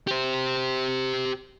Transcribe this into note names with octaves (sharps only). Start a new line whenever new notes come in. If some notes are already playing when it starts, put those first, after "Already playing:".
G4 C5